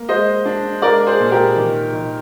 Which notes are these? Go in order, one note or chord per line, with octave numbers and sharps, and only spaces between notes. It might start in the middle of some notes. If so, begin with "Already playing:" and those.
Already playing: A#3
G#3 C5 D#5
D4
G#3 A#4 D5
G#4 C5
A#2
G4 A#4
D#3
D#3